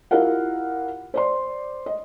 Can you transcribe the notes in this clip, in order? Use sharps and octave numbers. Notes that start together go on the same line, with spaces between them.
E4 F4 G4 A#4 F5 F#5
C5 D5 C6
D#5